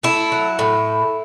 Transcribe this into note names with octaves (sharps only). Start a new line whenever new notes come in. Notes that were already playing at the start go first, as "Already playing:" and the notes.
A3 E4
F#3
A2